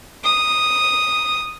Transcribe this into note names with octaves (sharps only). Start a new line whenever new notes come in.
D#6